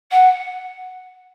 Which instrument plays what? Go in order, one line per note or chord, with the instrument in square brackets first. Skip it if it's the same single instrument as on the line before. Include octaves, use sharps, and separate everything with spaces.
[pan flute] F#5